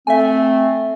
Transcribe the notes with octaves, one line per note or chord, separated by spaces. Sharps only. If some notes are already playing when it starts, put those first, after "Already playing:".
A3 C4 E5 G#5